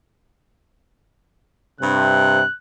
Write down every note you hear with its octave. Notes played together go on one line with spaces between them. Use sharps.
G2 C3 F#6